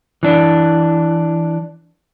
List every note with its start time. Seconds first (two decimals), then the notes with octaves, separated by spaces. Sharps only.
0.23 E3 D4